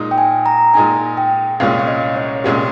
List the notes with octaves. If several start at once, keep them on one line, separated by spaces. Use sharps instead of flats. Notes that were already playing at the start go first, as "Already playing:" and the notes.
Already playing: A#2 G#3 D#4
G5
G#5
A#5
A#2 G#3 D#4 G#5
G5
C2 A#2 G#3 C#4 F4 F5
F5
D#5
C#5
C2 A#2 G#3 C#4 F4 G4